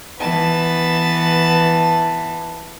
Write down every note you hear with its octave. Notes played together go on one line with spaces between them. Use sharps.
E3 B3 A5